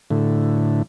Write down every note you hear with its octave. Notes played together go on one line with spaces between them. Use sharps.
A2 D3